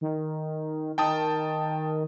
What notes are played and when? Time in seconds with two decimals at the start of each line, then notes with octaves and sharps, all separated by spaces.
0.01 D#3
0.98 D#3 G5 A5 D#6